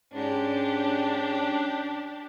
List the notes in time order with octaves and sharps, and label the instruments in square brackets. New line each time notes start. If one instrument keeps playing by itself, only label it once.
[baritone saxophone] G#2 [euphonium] C#4 [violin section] D4 G4